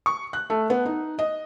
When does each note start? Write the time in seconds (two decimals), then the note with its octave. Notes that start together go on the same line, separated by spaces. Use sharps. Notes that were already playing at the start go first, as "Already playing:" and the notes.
0.06 C#6
0.33 F#6
0.50 A3
0.70 B3
0.85 D#4
1.19 D#5